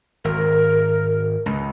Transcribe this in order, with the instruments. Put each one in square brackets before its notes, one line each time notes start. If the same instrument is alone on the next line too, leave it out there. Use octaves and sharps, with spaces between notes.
[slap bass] G#1 [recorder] A#4
[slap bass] C#2